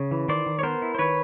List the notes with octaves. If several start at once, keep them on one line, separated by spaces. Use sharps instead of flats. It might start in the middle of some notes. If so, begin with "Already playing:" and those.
Already playing: C#3
E3
D#3 C5 D5
D#3
C#5
B3 A#4 C5
E4
C5
D#3 B4 C#5